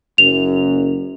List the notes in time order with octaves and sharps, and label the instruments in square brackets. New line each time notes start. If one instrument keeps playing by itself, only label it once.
[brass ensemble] F#1 F#2 [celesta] F7